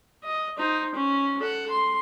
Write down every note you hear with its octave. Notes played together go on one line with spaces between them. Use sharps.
D#5
D#4 C5
C#4
A4 F#5
C6